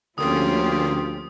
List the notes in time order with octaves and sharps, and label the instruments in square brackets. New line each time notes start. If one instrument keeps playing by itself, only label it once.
[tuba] D2 [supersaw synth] D3 A#3 C#4 [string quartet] F3 F4 G4 [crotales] D#6